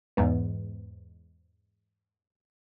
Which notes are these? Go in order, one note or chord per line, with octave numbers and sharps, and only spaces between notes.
E2 G#2 B3